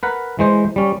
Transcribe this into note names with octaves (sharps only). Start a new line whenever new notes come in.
A#4 B4 F#5
E3 G#3 C5
G3 C#4